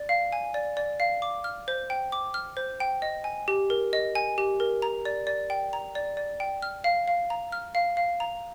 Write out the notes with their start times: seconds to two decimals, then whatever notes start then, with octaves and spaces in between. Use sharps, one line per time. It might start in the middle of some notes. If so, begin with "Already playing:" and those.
Already playing: D5
0.09 F5
0.32 G#5
0.54 D5
0.77 D5
1.00 F5
1.22 D6
1.44 F6
1.68 C5
1.90 G5
2.12 D6
2.34 F6
2.57 C5
2.80 G5
3.02 D#5
3.24 G#5
3.48 G4
3.70 A#4
3.93 D#5
4.15 G#5
4.38 G4
4.60 A#4
4.82 A#5
5.05 D5
5.27 D5
5.50 G5
5.73 A#5
5.95 D5
6.17 D5
6.40 G5
6.62 F6
6.84 F5
7.08 F5
7.30 A#5
7.52 F6
7.75 F5
7.97 F5
8.20 A#5